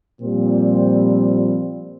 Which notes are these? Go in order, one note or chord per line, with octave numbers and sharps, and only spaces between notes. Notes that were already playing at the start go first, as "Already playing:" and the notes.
A#2 F3 G3 A#3 C4